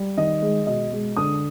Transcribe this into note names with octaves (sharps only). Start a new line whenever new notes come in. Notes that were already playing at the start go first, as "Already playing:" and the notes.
Already playing: G3
D#3 D#5
G#3
B2 D#5
G#3
D3 D#6